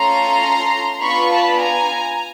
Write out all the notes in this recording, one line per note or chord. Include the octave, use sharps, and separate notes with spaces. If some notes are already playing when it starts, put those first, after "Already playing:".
Already playing: A3 C#4 F4 A4 A#5 C6
B3 D4 F4 B5 C#6
A5 B5
G#5 A#5